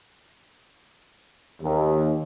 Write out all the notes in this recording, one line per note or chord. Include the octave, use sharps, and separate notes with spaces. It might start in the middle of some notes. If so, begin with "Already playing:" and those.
D#2